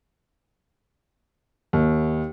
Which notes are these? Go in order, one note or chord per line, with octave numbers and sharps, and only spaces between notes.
D#2